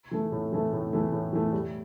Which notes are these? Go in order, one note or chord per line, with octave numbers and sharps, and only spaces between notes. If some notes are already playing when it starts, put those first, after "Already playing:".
E3 A3
A2
E3 A3
A2
E3 A3
A2
E3 A3
G3